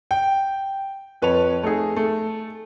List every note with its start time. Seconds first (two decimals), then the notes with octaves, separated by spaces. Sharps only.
0.11 G5
1.22 F2 B4 C#5 A5 F7
1.63 A3 D#4 G#4
1.97 A3